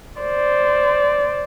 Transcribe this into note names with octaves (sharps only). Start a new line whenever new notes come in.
C5 D5